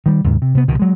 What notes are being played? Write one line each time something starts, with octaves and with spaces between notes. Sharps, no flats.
D#3 G3
D#2 G#2 C#3
C3
C3 B3
C2 B2 D#3
F#3 G#3